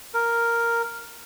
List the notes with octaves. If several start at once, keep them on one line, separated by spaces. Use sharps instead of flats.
A#4